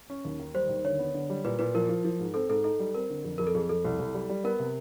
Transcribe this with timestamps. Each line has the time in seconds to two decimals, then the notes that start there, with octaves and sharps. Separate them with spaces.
0.10 C#4
0.25 D#2
0.39 D#3
0.54 G3 C5
0.69 D#2
0.84 D3 C#5
0.99 B3
1.14 D3
1.30 G3
1.44 A#2 B4
1.59 A#2 B4
1.74 F3 A#4
1.89 F3
2.05 F3
2.20 G#2
2.34 C4 A4
2.49 G#2 A4
2.64 D#4 A4
2.79 G3
2.95 C4 A#4
3.10 D3
3.24 F2
3.38 F2 A#4
3.47 A4
3.55 F2 G#4
3.69 F2 A4
3.85 C2
3.99 C2
4.15 G3
4.29 G3
4.44 B3 A#4
4.59 C3